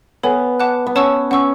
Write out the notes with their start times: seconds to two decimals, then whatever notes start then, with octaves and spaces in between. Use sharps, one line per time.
0.23 B3 A4 C#5 G#5
0.60 F#5 A5 D6 F#6
0.87 B3
0.95 C#4 C#5 F#5 A5 C#6 E6
1.31 C#4 F#5 C#6 E6